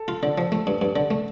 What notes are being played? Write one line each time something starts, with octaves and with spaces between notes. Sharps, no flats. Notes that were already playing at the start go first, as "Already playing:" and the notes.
Already playing: A4
F4
D3
F3
A3
G2
G2
D3
A3